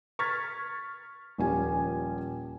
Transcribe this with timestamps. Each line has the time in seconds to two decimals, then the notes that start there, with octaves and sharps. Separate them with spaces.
0.19 C#6 F6 G#6 A6 B6
1.38 D#1 F3 C#4 G4 G#5